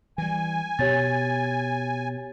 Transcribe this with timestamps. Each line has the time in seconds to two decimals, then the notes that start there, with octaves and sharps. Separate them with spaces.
0.18 E3 G3 G#5
0.79 B2 G4 C#5 A6